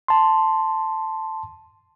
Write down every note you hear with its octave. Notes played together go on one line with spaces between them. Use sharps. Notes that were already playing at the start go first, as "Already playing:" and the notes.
A5 C6